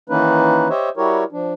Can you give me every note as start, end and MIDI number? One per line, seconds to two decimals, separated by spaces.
0.09 0.68 51
0.09 0.68 52
0.09 0.68 58
0.09 0.68 61
0.09 0.68 63
0.09 0.68 71
0.69 0.89 67
0.69 0.89 72
0.69 0.89 73
0.69 0.89 75
0.69 0.89 76
0.97 1.24 55
0.97 1.24 64
0.97 1.24 66
0.97 1.24 67
0.97 1.24 70
0.97 1.24 73
1.32 1.53 53
1.32 1.53 62